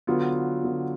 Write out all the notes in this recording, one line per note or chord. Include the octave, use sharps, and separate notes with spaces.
D3 F#3 B3 F4
D3 F#3 B3